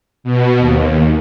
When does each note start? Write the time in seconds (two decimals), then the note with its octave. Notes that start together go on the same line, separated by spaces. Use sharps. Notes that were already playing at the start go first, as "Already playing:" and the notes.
0.24 B2
0.59 D#2